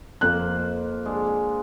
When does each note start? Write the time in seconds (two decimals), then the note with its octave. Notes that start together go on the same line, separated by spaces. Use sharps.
0.21 F2 A#3 C5 F#6
1.05 G#3 D4